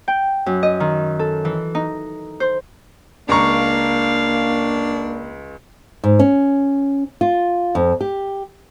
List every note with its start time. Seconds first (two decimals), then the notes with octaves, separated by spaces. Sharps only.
0.08 G5
0.46 F#2
0.63 D#5
0.80 D#3
1.19 A4
1.45 E3
1.75 D#4
2.40 C5
3.29 C#2 A#3 D4 F5 A#5 C#6
6.04 G#2
6.19 C#4
7.21 F4
7.75 F2
8.01 G4